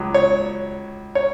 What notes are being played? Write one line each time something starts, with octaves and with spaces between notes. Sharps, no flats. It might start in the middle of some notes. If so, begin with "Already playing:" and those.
Already playing: C#2 F#3
C#5
C#5